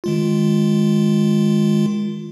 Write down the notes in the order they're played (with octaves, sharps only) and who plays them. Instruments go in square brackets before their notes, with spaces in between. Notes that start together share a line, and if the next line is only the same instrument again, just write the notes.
[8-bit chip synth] D#3 G#3 F4